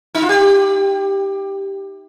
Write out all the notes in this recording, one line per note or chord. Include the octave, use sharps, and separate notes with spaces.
D#4
F4
G4